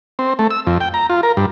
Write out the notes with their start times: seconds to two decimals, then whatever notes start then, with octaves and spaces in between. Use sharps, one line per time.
0.19 C4
0.39 A3
0.51 E6
0.67 F2
0.80 G5
0.94 A#5
1.10 F4
1.23 A#4
1.37 G2